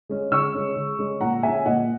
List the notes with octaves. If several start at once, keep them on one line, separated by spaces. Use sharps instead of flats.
G#3 C#4
C#3 C#6 E6
G#3 C#4
C#3
G#3 C#4
A#2 F#5 A#5
G#3 C#4 E5 G#5
A#2 D#5 F#5